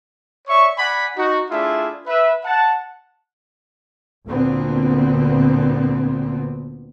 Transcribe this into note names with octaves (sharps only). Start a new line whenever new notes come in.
C#5 D5 E5 C#6
D5 F#5 G#5 B5
D#4 F#4
A3 D4 E4 F4 G#4 E5
B4 E5
F#5 A5
D2 A#2 D3 B3 C4